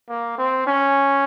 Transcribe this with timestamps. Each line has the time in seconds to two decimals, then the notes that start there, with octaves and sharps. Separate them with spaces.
0.09 A#3
0.38 C4
0.67 C#4